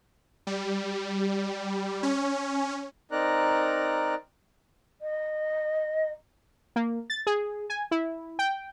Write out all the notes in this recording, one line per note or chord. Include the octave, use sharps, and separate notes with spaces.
G3
C#4
C4 D#4 A#4 D5 A#5 F#6
D#5
A#3
A6
G#4
G#5
E4
G5